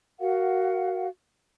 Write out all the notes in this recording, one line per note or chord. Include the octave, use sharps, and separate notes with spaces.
F#4 A#4 F5 F#5